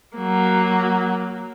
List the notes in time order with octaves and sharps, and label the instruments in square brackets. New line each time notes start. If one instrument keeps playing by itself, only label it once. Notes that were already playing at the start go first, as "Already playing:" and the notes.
[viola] F#3 A#3